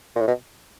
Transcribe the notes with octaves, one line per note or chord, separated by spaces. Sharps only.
A#2
A2
B2